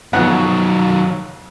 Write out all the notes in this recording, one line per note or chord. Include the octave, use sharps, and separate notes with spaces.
F2 D#3 F#3 B3 F#5